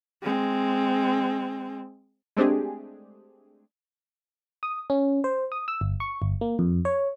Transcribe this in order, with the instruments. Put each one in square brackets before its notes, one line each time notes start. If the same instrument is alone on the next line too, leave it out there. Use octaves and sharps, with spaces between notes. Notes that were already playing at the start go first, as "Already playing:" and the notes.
[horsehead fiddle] G#3 C4
[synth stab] G#3 A3 C4 D4 G4 G#4
[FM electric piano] D#6
C#4
C5
D#6
E6
G1
C#6
G1
A#3
F2
C#5